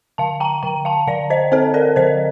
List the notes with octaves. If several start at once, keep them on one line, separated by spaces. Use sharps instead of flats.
D3 F5 A5
G5 A#5
D3 G5 A#5
F5 A5
D3 D5 F5
C5 D#5
C4 A4 C5
A#4 D5
D3 C5 D#5